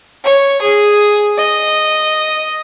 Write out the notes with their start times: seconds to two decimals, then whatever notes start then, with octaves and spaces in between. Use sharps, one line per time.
0.25 C#5
0.62 G#4
1.38 D#5